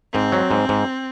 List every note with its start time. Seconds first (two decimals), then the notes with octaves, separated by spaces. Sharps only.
0.13 G#2 C4
0.32 F#3
0.51 G#2
0.69 G#2